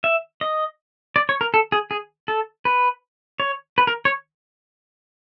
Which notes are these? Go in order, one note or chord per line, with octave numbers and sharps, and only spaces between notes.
E5
D#5
D5
C#5
A#4
A4
G#4
G#4
A4
B4
C#5
B4
A#4
C#5